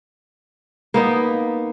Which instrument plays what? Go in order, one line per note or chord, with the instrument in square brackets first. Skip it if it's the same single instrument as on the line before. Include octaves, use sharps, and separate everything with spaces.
[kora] A#3 B3 D#4